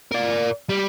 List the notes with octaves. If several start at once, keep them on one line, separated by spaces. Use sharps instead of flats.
A#4 D5
G3